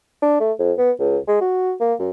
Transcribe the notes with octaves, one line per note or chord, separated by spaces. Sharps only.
D4
A3
F2
B3
C#2
G#3
F#4
A#3
F#2